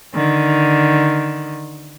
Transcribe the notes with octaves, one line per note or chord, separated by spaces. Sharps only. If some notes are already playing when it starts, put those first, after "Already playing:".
D3 D#3